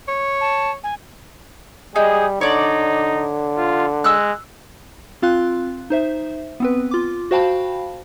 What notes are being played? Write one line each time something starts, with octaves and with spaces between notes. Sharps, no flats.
C#5
A5
G#5
G3 D#4 G#4
D3 D#4 C#5 D5
F4
G#3 E6 F#6
C4 F4 F5 C6 F#6
D#4 C5 E5
B3 C4 B4
F4 D6
F#4 C5 F5 G5 A5 B5